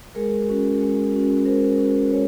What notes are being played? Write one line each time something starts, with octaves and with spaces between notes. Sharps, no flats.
G#3 G#4 A#4
C#4 F#4
G#3
C#4 F#4
G#3 A#4 C5
C#4 F#4
G#3 B4 C#5